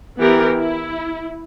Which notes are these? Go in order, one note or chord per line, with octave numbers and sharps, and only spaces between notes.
E3 B3 G4 A#4
E4